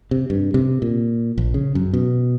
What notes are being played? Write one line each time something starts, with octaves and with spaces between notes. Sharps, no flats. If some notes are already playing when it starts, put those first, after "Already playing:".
C3
G2
C3
A#2
A#1
C#3
F#2
B2